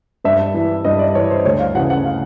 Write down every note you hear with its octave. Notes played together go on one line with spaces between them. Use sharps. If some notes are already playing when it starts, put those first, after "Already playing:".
G2 E5
E3
G2 D#5
D5
E3 C#5
C5
D2 C#5
F5
C#3 E3 F#5
F#5
F5